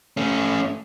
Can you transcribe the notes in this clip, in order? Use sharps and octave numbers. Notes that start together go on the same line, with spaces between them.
A3 C#4